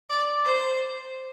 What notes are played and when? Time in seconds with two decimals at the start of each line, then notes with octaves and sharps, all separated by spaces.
0.09 D5
0.44 C5